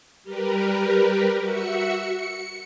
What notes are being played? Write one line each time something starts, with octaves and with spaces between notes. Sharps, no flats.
G3 G4 A#4 B4
F#4 E5 C#7
C#7